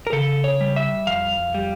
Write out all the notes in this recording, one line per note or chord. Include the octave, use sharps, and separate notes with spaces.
A#4
C#3 A4
C#5
G3
E5
F2 F5
G3